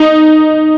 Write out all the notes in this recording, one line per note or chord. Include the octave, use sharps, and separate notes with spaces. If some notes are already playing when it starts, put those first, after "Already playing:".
Already playing: D#4